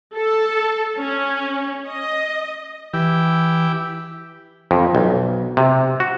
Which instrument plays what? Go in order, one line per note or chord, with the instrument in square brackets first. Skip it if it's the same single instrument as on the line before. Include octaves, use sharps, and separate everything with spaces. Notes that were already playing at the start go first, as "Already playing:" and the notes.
[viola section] A4
C#4
D#5
[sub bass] E3 [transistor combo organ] E4 G4
[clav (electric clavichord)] F2
B1
C3
F#4